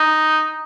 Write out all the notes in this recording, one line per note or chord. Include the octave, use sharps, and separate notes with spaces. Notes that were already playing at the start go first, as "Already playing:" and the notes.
Already playing: D#4